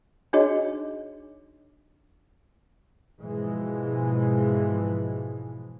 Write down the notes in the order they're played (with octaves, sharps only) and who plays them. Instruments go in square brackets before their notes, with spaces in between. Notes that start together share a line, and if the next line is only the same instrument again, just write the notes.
[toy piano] D4 D#4 F#4 G#4 C#5 D#5
[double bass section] G#2 B2 E3 F3 G#3